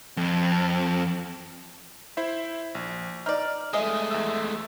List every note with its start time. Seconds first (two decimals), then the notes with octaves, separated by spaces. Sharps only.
0.17 F2
2.17 E4 C5 E5
2.75 A#1
3.26 D#4 D5 F6
3.73 G#3 A3 G#4 D#5 E5 D#6
4.11 E2 E5 E6